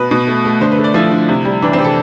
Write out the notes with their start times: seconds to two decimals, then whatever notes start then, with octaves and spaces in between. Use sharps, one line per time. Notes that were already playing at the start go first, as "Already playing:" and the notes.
Already playing: B2 B4
0.11 B2
0.27 A3
0.45 A3
0.61 D3 C5
0.72 B4
0.78 A3
0.84 D5
0.94 F3 E4
1.11 D3
1.29 C3
1.45 G3
1.62 E3 D4
1.73 C4
1.79 C3
1.84 A4